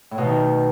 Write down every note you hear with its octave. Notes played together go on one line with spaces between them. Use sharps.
A2
B2
D#3